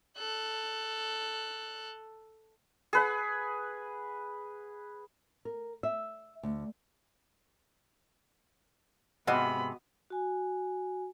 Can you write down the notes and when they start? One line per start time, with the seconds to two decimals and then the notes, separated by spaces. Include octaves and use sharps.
0.18 A4 F#6
2.93 G#4 B4 F#5
5.45 A#4
5.83 E5
6.43 D2
9.27 G#2 C3 B3 F#4 D#5 B5
10.10 F#4 G#5